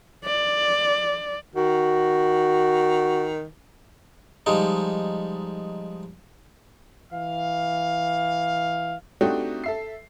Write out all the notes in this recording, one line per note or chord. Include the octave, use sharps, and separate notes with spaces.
D5
D#3 F#4
F3 G3 G#3 D#4
E3 F5
A3 C4 D4 D#4 F#4 G4
A4 E5 C7